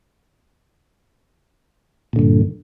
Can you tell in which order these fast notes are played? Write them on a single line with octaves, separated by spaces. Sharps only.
A#2 D3 G2